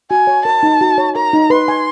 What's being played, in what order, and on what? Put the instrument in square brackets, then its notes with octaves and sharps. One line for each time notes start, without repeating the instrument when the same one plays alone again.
[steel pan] F#4 [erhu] G#5
[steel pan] C#5
[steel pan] A#4 [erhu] A5
[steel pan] D#4
F#4
C#5
[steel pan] A#4 [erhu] A#5
[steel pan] D#4
[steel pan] B4 [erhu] C6
[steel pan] G#5